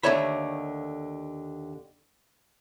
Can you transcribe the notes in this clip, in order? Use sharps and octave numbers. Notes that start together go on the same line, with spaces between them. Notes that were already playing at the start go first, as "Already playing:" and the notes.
D#2 D3 A3 C#5 E5 B5